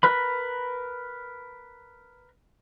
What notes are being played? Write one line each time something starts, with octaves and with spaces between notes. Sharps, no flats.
A#4 B4 B5